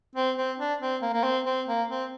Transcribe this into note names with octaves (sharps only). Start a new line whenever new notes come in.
C4
C4
D4
C4
A#3
A#3
C4
C4
A#3
C4